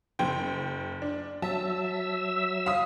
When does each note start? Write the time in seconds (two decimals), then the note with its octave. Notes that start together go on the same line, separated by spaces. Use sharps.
0.19 F#1 G5
1.02 D4
1.42 F#3 E5 A5 E6
2.66 F5 D#6